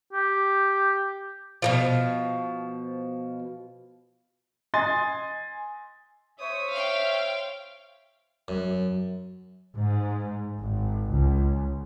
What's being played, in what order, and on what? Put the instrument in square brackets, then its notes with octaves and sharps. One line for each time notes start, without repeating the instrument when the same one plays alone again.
[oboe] G4
[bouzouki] B2 D3 F3
[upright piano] D#5 G#5 C6 A6
[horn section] C5 C#5 [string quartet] E5 [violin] D#6
[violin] F5 G5
[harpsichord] F#2
[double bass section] G#2
G#1
C#2